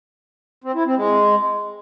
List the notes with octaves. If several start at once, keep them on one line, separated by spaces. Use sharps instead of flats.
C4
E4
C4
G#3